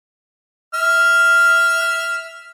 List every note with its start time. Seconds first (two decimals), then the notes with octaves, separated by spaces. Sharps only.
0.74 E5 F6